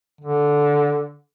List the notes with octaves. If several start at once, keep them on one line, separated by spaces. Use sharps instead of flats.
D3